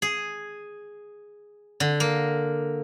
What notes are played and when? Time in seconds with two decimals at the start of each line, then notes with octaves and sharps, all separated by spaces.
0.02 G#4
1.80 D3
2.00 A#3